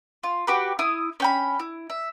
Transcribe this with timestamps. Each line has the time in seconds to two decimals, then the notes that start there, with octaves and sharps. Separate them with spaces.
0.23 F4
0.47 F#4 G4 B4
0.79 E4 D#6
1.20 C#4 G5 B5
1.60 E4
1.90 E5